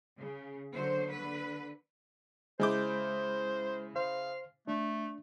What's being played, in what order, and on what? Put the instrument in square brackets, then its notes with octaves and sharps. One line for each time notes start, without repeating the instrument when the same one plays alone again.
[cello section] C#3
D3 F#3 A#3 C5
D3 B4
[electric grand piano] C#3 E4 D6 [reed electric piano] G#3 G6 [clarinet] C5
[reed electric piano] C5 [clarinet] F5
[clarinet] A3 [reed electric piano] D4